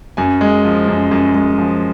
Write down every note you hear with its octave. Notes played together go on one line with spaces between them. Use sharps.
F#2 G#5
G#3
F3
F#2
F#2
G#3
F3